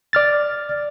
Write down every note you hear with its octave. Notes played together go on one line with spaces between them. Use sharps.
D5 F6 A6